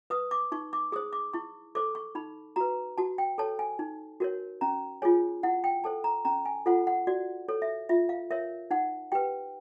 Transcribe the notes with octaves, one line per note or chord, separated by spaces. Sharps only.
B4 D#6
D6
D#4 C#6
D6
G#4 C5 D#6
D6
E4 C#6
A4 C5 D6
C#6
D#4 B5
F#4 B4 A#5
F#4 A5
G5
A4 C#5 A5
G#5
D#4
F#4 A#4 C#5
C#4 A#5
F4 G#4 C#5 G#5
E4 F#5
G5
A4 C5 A5
A#5
C#4 A#5
G#5
F4 A4 C5 F#5
F#5
F#4 D5
A4 C#5
E5
F4 E5
F5
A#4 C#5 E5
D#4 F#5
G4 B4 G5